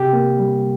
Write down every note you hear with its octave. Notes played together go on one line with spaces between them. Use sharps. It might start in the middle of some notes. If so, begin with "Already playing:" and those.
Already playing: C3 G4
A#3
G3